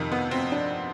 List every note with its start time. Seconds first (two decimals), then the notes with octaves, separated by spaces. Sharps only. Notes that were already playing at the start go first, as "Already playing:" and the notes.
Already playing: F2 C3 D#3
0.12 B3
0.31 C4
0.52 D4